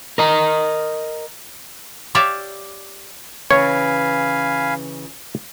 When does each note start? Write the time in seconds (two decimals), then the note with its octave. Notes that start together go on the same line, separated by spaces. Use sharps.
0.18 A#4 D#5 A#5
2.15 G4 C#5 D5 E5 F5
3.51 C#3 E3 C#5 F5 G#5 B5